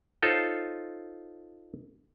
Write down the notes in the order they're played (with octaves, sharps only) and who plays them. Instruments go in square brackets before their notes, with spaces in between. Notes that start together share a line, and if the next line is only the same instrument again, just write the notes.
[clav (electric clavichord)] D#4 F4 A4 C5 C#5